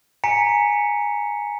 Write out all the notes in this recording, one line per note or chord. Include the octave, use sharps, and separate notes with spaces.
G#5 A#5 B6 C#7